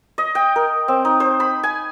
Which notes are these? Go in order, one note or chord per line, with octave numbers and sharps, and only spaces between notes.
D#5
G5
A#4
C4
D#4
C5
B5
G#5